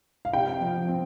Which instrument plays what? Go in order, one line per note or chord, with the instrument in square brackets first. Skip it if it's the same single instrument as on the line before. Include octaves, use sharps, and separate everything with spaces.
[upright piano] F5
C3 G5
F3
C4